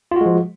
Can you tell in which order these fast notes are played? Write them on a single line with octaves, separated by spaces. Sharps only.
F4 F#4 G#3 F3